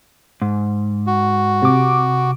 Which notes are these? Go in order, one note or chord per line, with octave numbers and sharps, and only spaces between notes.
G#2
F#4
C3 D6